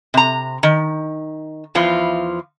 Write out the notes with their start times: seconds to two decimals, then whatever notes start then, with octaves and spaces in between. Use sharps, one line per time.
0.14 C3 A#5
0.63 D#3
1.75 E2 E3 F3 F4